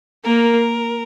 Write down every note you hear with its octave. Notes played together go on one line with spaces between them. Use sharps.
A#3 A#4